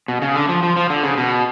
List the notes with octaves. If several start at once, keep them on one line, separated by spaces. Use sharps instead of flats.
B2
C#3
D3
F3
F3
F3
D3
C#3
B2